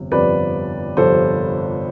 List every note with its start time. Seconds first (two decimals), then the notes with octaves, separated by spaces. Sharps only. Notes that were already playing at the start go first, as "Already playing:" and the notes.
Already playing: G1 F2 C3
0.12 G1 F2 C3 B4 D5
0.97 G1 F2 C3 A4 C5